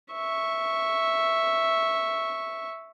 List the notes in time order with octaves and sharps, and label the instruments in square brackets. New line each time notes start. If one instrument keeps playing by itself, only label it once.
[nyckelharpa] E5 C#6